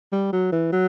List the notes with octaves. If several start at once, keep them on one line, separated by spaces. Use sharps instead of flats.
G3
F#3
E3
F#3